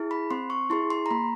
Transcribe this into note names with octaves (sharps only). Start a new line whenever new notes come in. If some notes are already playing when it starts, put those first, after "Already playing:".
Already playing: E4 G#4
B5
C4 C6
C#6
E4 G#4 C6
C6
A#5
A#3 B5